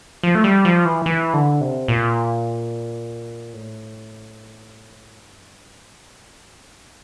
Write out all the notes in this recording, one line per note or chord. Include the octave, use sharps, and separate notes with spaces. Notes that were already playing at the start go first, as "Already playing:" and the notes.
F3
A3
G3
F3
E3
E3
D3
C3
A#2
A2
G2
A#2
A2